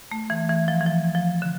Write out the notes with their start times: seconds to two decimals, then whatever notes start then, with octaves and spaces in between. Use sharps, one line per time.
0.12 A3
0.30 E3
0.49 E3
0.68 F3
0.81 E3
0.86 F3
1.15 F3
1.42 D3